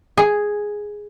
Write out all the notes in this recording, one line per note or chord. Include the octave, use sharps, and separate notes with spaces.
G#4